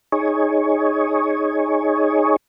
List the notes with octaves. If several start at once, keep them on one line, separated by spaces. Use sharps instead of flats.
D#4 G#4 C#5